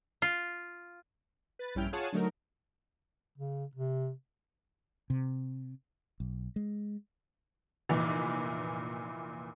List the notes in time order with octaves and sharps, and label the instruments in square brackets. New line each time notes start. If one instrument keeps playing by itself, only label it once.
[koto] F4
[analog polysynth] B4 A6
A#1 G2 C#4 E4 G5 F6
F4 G#4 C#5 F#5 G#5 A5
D3 F#3 A3 D#4 A#4
[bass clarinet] C#3
C3
[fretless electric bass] C3
[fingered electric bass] B1
G#3
[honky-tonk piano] F1 A#2 E3